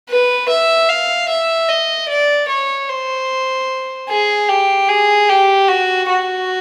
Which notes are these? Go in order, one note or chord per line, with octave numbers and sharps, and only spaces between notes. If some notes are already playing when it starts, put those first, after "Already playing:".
B4
E5
F5
E5
D#5
D5
C#5
C5
G#4
G4
G#4
G4
F#4
F#4